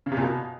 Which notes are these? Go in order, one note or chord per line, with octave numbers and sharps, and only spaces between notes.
C#3
C3
A#2
B2